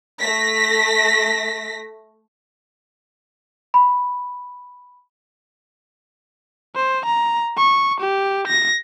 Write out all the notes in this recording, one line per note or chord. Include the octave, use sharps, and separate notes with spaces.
A3 A#6 B6
B5
C5
A#5
C#6
G4
A#6